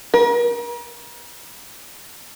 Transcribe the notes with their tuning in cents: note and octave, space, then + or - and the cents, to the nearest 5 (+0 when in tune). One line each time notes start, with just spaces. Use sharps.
A#4 +40